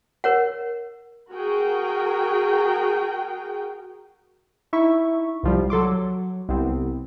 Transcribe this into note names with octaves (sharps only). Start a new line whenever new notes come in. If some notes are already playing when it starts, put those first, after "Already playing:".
A#4 C#5 F#5
F#4 G#4 A#4 G5
D#4 E4 E5 C#6
C2 F3 G3
F#3 A4 C6 D6
F#3
C2 B3 C4